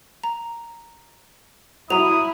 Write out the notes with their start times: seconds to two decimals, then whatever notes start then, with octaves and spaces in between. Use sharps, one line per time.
0.24 A#5
1.90 F#3 E4 A#5 D#6 F7